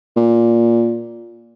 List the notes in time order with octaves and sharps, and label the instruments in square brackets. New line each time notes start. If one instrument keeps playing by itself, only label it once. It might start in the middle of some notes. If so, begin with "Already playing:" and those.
[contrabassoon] A#2